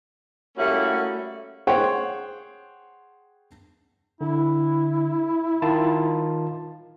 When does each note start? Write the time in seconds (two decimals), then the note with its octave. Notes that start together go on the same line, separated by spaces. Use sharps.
0.57 G3 A3 A#3 C#4 E4 F#4
1.67 G#4 C5 C#5 F#5 G5 C6
4.21 D3 E4
5.62 D#3 F4 A5